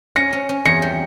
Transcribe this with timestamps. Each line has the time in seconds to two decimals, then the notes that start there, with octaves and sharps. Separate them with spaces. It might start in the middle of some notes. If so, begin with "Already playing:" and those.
0.16 C#4 A#6 C#7
0.33 C#4
0.49 C#4
0.65 E2 A#6 C#7
0.82 G3